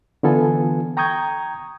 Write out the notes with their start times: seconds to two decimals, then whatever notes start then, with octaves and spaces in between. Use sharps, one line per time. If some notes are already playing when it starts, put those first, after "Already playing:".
0.23 D3 E3 B3 F4 A4 G#5
0.97 G5 A#5 C#6 D#6 G6 G#6